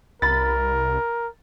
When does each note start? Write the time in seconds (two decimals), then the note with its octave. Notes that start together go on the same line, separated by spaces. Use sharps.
0.22 C2 A#4 B5 A6